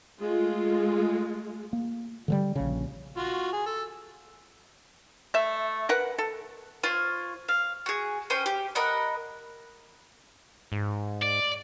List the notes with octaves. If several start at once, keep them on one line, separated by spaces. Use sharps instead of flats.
G#3 A3 F4
A#3
D3 F3 G3
A#1 C#3
F4 F#4
G#4
A4
A3 E5
A#4 B4 F#5
A4
F4 C5 C#5
F5
F#4 G#4
C#4 C5 G5 D#6
G4
A#4 D#5 F#5 B5
G#2
D5